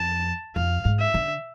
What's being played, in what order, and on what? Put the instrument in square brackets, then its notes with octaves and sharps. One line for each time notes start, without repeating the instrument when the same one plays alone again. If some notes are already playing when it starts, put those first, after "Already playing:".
Already playing: [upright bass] F2 [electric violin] A5
[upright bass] F2 [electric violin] F5
[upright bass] G#2
[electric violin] E5
[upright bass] D3